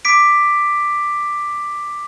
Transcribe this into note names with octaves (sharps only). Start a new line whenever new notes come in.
D6 B6 D7